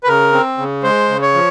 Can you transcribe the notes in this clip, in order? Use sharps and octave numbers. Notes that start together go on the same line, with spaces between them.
B4
C#3 A#4
C4
C#3
G#3 C5
C#3
C#5
F3